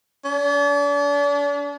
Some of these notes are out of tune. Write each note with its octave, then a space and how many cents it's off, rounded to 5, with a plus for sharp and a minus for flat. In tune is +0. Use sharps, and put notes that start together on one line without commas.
D4 -40